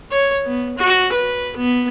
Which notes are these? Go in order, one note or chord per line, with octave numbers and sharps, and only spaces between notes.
C#5
B3
F#4
B4
B3